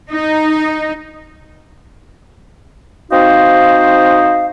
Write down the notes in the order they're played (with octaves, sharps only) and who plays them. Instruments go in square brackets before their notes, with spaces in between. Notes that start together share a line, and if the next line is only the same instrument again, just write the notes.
[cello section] D#4
[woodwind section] C4 D#4 F#4 C5 D#5 F5